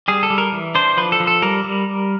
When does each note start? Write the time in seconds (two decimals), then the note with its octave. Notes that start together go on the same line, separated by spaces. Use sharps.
0.08 G3 G#4
0.23 A4
0.30 G3
0.38 A#4
0.52 E3
0.75 D4 C5
0.97 F3 B4
1.12 A4
1.20 F3
1.27 A4
1.42 G3 A#4
1.64 G3